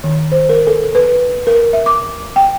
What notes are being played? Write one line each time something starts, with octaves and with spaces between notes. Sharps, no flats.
D#3
C5
A#4
A4
B4
A#4
E5
D6
G5